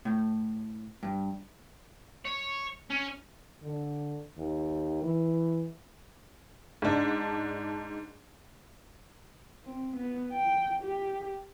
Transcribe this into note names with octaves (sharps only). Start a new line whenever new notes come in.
A2
G2
C#5
C#4
D3
D#2
E3
G#2 D4
C4
B3
G5
G4